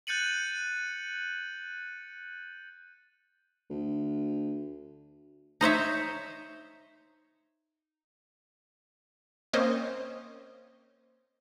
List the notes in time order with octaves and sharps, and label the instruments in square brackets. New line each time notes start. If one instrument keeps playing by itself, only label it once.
[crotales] F#6 G6 A6 C#7 D#7 F#7
[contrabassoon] D2
[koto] D#4 C5 C#5 E5
[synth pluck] A#3 C4 C#4 C5 C#5 D#5